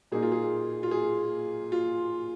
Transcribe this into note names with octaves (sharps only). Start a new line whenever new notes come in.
A#2 A#3 D#4 G#4
F4
G#4
F4
G#4
F4